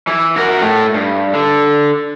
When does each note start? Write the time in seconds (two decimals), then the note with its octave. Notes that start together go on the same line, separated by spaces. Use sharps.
0.08 E3
0.36 F#4 A#4
0.62 A2 A3
0.94 G2
1.33 D3